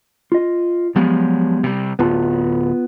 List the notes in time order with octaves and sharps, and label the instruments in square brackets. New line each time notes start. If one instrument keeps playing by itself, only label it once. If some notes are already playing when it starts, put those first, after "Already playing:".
[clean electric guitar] F4 D#5
[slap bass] F3 G#3 [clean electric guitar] F#3 B3 G4
[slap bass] C3 G3
[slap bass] D1 [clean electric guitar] B3 F4 A5